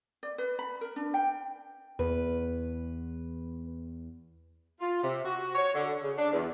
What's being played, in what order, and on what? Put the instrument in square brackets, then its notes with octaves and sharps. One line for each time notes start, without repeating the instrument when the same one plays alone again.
[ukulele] D5
B4
B5
A#4
D4
G5
[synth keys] E2 [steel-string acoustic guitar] B4
[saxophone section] F4
C3
F#4
C#5
D3
C#3
D4
E2